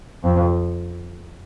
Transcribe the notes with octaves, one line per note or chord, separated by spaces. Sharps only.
F2